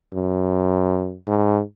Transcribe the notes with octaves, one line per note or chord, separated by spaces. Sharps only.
F#2
G#2